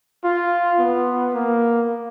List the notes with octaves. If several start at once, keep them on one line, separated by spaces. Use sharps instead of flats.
F4
B3
A#3